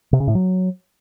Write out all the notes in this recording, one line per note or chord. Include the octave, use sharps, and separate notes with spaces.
C3
C#3
A2
F#3